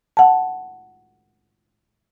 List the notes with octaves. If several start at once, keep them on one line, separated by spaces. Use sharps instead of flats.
F#5 A5